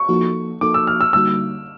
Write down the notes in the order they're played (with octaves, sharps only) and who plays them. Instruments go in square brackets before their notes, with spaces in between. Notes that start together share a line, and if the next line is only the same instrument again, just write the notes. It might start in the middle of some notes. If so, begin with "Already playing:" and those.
Already playing: [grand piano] C#6
[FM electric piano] F3 A#3 D#4 F#4 A4
[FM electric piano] F3 A#3 D#4 F#4 A4 [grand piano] D6
[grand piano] E6
F6
E6
[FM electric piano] D3 G3 A#3 D#4 F#4 [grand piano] E6